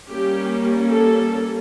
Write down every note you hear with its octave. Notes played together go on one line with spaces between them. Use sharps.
G3 A#3 C#4 G4
A4